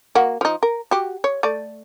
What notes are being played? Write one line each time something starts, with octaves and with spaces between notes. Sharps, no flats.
A#3 F#4
F3 D#4
A#4
F#4 G4
C#5
A3 D5